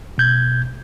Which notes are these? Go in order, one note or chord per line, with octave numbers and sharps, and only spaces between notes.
B2 G6 G#6